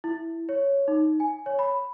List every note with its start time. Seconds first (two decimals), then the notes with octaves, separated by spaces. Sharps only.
0.04 E4
0.49 C#5
0.88 D#4
1.20 G#5
1.46 C#5
1.59 B5